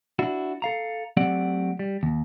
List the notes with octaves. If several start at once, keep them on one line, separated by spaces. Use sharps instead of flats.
D4 E4 F#4
A4 F5 A#5
F#3 A3 C4 G4 D5 F#5
G3
D#2